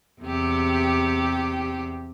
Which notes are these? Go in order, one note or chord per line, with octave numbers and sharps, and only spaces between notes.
E2 C3 G4